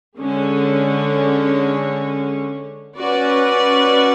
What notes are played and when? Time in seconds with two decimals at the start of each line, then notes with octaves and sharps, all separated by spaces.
0.18 D3 G#3 C#4
2.96 C#4 F#4 B4 D5